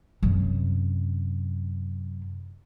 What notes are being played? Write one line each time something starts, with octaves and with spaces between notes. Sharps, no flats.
F#2 C3